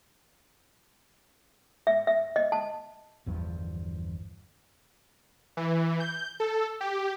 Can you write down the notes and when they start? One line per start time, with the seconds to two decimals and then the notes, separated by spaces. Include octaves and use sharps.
1.87 E5
2.07 E5
2.36 D#5
2.52 A5
3.26 G1 E2 G2 F3
5.57 E3
6.00 G6
6.40 A4
6.81 G4